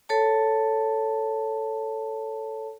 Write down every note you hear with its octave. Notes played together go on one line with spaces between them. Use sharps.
A4 C#5 A5